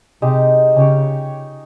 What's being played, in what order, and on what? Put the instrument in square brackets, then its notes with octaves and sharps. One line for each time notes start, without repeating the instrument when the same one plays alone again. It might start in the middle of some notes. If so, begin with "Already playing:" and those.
[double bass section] C3 [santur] G#3 D#4 G4
[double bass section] C#3 [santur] C#4 G4 C#5